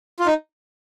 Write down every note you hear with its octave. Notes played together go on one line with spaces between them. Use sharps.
F4
D#4